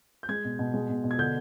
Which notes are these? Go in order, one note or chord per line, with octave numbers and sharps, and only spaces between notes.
G6
G#3 G#6
B2
B2
G#3
B2
B2
G#6
D3 G6